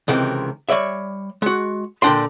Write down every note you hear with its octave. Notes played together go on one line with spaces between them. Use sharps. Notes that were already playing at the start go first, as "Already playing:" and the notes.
C#2 C3 D#3 E3
G3 C#5 D5 E5
G#3 F#4
A#2 D3 E3 D4 G5 C6